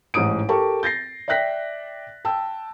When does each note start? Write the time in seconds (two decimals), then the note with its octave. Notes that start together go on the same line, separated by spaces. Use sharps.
0.14 A1 G#2 D#4 D#6 D7
0.49 G4 A4 A#4 A5 C#6
0.83 G6 A6 A#6 C7
1.28 D5 E5 G5 F#6 A#6 B6
2.25 G5 A5 E6